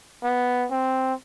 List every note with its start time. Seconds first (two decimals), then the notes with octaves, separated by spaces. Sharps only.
0.24 B3
0.71 C4